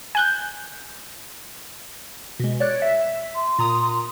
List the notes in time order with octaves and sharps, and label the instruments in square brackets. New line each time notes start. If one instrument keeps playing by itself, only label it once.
[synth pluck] G#5 F#6 G6
[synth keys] B2 G#3
C#5 D5 F#6
E5
[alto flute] C6
[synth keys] A#2 A#5 D#6